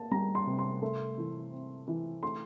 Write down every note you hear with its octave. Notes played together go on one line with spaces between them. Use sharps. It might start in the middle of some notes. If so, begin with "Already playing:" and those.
Already playing: A#3 A5
G3 A#5
C6
C3
C6
A3
E3
C4
E3
A3 C6